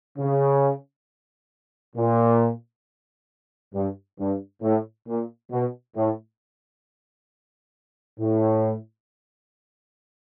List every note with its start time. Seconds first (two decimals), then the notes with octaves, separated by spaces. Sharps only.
0.18 C#3
1.96 A#2
3.74 G2
4.19 G2
4.62 A2
5.08 A#2
5.52 B2
5.96 A2
8.19 A2